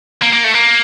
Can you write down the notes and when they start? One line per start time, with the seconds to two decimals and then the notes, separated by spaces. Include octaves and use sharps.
0.22 A#3
0.33 A#3
0.44 A3
0.54 A#3